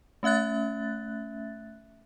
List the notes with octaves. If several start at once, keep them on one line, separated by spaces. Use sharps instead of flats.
A3 C#4 E5 F#6 A6